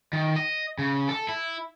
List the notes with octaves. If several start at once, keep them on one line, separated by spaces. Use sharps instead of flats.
D#3
D#5
C#3
A4
E4